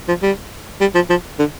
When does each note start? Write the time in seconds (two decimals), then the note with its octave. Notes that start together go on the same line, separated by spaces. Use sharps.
0.08 F3
0.22 G3
0.81 G3
0.95 F3
1.10 F3
1.39 D3